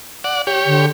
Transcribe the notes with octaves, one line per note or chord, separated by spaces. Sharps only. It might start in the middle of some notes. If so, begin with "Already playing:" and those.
D5 F#5
G4 C#5
D3